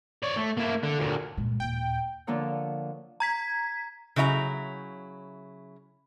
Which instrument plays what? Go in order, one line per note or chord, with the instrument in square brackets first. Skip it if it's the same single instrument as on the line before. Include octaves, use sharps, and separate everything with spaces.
[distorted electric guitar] C#5 D5
A3
A#3 E4
D3
D2 A#2
[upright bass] A#2 G#3
[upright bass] D#2 A#2 [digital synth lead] G5
[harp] D3 F3 A#3 F4 C#5
[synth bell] A#5 G#6 B6
[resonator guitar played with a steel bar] C#3 F#3 E4 D#5 A#5